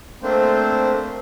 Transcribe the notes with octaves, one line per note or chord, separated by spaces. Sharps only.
A3 A#3 C4 D4 C5